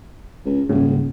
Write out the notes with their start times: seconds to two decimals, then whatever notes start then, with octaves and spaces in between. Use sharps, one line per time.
0.45 C#2
0.69 D#1 G#2 C#3